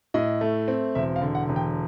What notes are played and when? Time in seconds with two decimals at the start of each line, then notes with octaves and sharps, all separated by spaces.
0.14 A2 D#5
0.41 A3
0.68 C4
0.95 E1 E5
1.16 F5
1.21 D3
1.35 F#5
1.49 E1
1.56 G5